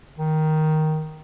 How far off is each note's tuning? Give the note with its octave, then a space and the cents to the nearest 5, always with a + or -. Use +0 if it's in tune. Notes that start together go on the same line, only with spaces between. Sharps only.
D#3 +5